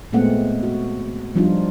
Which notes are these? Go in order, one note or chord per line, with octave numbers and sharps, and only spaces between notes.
A#2 G#3 A3 B3 C4 F#5
F#4
F3 G3 D4 D#4 F4